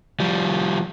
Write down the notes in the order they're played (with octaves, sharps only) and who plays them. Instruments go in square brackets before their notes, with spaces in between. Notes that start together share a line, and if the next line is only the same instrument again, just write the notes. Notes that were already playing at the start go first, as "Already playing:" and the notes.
[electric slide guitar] F3 G3